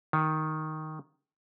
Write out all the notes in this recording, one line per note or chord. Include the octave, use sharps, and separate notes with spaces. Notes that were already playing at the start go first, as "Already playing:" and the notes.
D#3